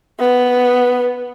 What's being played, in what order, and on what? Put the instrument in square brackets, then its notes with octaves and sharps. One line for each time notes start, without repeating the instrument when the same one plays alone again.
[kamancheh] B3